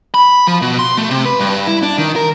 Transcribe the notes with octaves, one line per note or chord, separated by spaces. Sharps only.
B5
F3
B2
C6
A3
C3
B4
G2
E4
D4
D#3
A#4